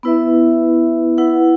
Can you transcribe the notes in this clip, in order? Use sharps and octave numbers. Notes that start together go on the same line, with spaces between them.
B3 E4 B4 E5
E4 B4 F#5